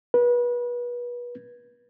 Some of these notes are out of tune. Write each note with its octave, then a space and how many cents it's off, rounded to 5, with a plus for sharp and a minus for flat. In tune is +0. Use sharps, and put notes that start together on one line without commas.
B4 -30